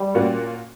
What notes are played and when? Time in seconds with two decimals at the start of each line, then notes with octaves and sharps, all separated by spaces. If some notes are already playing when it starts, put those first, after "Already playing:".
Already playing: G3
0.15 A#2 A#3 C#4 F#4